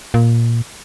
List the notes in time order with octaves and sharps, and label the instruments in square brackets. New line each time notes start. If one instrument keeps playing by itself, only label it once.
[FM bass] A#2